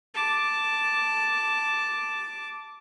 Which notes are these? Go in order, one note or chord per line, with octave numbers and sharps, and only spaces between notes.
A5 D6